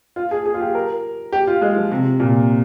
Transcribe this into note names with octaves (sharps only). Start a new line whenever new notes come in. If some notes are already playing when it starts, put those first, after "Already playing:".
F4
G#4
G#4
F4
G4
A#4
G4
F4
G#3
F3
C3
A#2